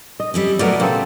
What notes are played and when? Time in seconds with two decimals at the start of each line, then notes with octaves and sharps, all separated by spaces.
0.20 D#5
0.34 G3 C4 C#4
0.59 B2 F#3 A3 B3 A#4 D5
0.80 C#3 A#3 C4 A4